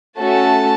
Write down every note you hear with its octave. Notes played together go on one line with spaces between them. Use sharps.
A3 C#4 F#4 A4 A5